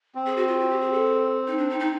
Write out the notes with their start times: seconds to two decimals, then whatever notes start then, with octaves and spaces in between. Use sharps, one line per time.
0.15 C4
0.26 G#4
0.37 F#4
0.48 F4
0.59 F#4
0.70 G4
0.81 G#4
0.92 A4
1.47 D#4
1.58 D4
1.70 D#4
1.80 D#4